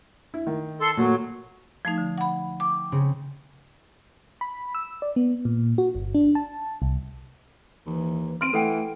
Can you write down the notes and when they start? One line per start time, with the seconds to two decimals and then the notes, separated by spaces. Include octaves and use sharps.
0.34 E4
0.47 D#3
0.81 A4 C6
0.97 A#2 F#3 A3
1.85 F3 A3 D#4 G#6
1.98 D3
2.18 F#5 B5
2.60 G5 D6
2.92 C#3 C4 C#4
4.41 B5
4.75 E6
5.02 D5
5.16 B3
5.45 A#2
5.78 F#4
5.95 G1
6.15 D4
6.35 A5
6.82 C2
7.86 D#2 E3
8.41 C4 C6 F6 D7 D#7
8.54 E3 A3 A4 F#5 G5